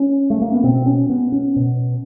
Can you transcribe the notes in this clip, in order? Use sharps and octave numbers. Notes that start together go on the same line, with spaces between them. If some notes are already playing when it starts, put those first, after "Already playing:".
Already playing: C#4
A3
A#3
B3
B2 C4
C#4
B3
C#4
B2